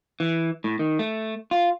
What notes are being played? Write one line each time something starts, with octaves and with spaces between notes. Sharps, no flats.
E3
A2
D#3
A3
F4